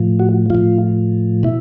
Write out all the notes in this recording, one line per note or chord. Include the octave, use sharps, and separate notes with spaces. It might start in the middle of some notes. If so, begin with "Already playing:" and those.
Already playing: A2 F3
F#4
A2 F3 F4
B2 E4